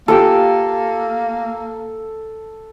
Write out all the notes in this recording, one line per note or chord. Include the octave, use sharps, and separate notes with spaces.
A#3 F4 G4 A4 E6